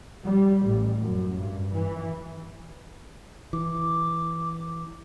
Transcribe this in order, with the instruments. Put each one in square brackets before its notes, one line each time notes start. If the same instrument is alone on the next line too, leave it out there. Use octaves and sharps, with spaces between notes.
[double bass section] G3
A1
F#2
G2
E3
[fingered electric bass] E3 [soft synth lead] D6